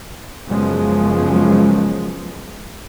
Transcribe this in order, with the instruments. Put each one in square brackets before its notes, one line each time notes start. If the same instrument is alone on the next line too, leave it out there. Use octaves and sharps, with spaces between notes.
[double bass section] F#2 C#3 F3 G#3 B3